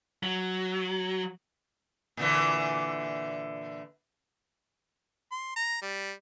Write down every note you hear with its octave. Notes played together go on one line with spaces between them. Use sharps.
F#3
A#2 D3 E3
C6
A#5
G3